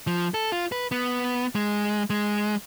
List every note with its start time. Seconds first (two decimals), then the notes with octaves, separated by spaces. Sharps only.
0.07 F3
0.34 A4
0.52 F4
0.72 B4
0.92 B3
1.55 G#3
2.10 G#3